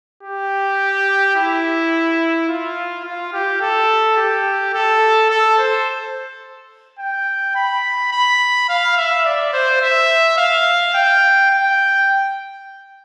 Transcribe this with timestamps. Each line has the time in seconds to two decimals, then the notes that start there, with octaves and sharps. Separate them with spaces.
0.23 G4
1.36 E4
2.49 F4
3.05 F4
3.33 G4
3.61 A4
4.17 G4
4.74 A4
5.30 A4
5.58 C5
6.99 G5
7.56 B5
8.12 B5
8.69 F5
8.97 E5
9.25 D5
9.53 C5
9.82 E5
10.38 F5
10.94 G5
11.51 G5